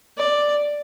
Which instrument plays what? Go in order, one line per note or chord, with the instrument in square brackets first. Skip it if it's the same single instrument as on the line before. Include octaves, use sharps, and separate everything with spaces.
[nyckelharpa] D5